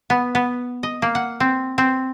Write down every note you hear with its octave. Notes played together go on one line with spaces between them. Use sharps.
B3
B3
D#5
A#3
F#5
C4
C4